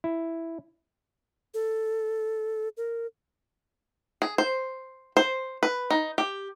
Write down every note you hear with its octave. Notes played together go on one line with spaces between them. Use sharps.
E4
A4
A#4
G#4
C5
C5
B4
D#4
G4